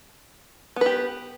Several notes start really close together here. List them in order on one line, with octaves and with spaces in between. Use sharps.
B3 B4 G4